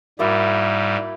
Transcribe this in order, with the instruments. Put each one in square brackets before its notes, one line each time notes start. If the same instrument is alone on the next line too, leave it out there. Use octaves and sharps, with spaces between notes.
[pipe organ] G#2 G3 [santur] A#3 E4 F#4